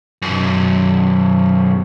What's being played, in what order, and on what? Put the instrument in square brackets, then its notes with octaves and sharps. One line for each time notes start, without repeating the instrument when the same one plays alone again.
[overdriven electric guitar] B1 F#2